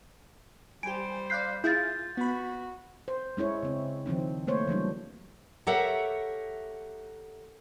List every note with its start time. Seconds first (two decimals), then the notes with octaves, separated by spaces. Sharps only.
0.83 G3 G4 C5 G#5 D7
1.30 D5 F5 F#6 G6 B6 C7
1.64 E4 F4 G#4 F5 G6 A6
2.17 B3 F#4 B5
3.08 C5
3.37 G#3 C#4 E4 C#5
3.63 C#3 C4
4.06 D#3 F3 C4 D#4
4.47 A3 A#3 C5 C#5
4.68 E3 F#3 G3 D4
5.67 G4 A4 A#4 C#5 E5 F#5